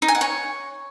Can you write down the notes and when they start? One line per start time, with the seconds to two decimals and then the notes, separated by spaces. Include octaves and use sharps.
0.02 D#4
0.08 G#5
0.15 F#5
0.21 C#5